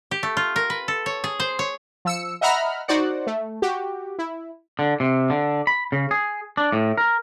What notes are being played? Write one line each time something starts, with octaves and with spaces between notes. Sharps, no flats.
G4
A3
F4
A#4
B4
A4
C#5
G#4
C5
C#5
F3 E6 C#7
D#5 E5 F#5 A#5 B5 F6
D#4 F#4 C5 D5 F#5
A3
F#4 G4
E4
D3
C3
D3
B5
C#3
G#4
D4
A2
A#4